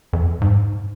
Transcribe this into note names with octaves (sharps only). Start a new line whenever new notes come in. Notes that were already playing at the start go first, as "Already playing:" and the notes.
F2
G#2